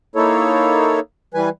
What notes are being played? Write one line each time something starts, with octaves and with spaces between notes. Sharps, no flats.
A#3 D#4 E4 A4 C#5
E3 G3 B4 G#5